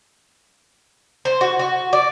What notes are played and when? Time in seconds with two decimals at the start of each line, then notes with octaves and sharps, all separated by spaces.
1.25 C5
1.41 F#4
1.59 F#4
1.93 D5